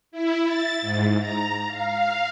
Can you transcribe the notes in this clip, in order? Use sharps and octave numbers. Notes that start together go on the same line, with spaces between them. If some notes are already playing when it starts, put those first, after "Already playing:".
E4
A6
G#2
A#5
F5